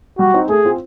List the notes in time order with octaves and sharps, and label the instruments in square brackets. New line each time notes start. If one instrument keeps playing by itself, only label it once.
[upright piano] G3 [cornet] F#4
[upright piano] C4 D#4
[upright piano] A3 [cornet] G#4
[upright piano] C4 F4